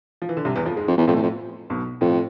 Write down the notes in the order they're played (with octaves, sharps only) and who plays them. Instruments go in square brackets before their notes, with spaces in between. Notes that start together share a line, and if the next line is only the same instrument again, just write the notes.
[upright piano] F3
E3
D3
C2 C3
E2 E3
F2 F3
G#2 G#3
[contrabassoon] F2
E2
[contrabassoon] F2 [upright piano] A2 A3
[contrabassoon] E2
F2
[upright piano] B1 B2
[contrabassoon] F2 [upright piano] A2